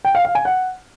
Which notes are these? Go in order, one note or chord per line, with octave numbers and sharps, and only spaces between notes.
G5
F5
F5
G#5
F#5